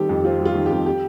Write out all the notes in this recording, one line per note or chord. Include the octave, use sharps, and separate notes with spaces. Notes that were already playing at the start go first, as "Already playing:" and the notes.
Already playing: D#3 G3 C4 G4 A4
F2
C4 F4
G3
F4
D#3
F2 G4
G4